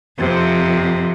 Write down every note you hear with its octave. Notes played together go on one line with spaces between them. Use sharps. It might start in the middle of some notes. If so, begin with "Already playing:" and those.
F2 C3